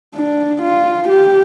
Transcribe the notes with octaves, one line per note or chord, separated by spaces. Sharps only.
D4
F4
G4